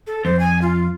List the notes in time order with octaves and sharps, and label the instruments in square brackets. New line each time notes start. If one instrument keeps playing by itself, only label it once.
[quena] A4
[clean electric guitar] F2 [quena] C5
[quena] G#5
F4